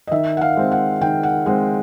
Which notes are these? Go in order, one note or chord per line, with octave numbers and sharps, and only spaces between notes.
D#5
D#3 E5
F#5
F5
G#3 C4
F#5
D#3 G5
F#5
G#3 C4 F#5